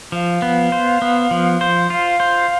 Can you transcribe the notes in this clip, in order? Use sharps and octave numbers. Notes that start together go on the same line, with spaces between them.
F3 F5
B3
C5
B3
F3
C5
F4 F5
C5